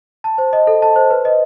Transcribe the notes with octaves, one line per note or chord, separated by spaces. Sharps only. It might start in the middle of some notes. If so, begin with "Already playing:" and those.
A5
C5
D#5
A4
A5
C5
B4
D#5